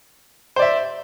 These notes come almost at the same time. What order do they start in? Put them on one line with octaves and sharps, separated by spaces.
C5 D5 E5